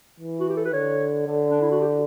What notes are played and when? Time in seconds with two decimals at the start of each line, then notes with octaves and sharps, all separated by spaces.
0.20 E3
0.40 F#4
0.49 G4
0.57 A4
0.65 B4
0.73 D3 C#5
1.27 D3
1.51 D4
1.61 E4
1.71 F#4
1.81 G4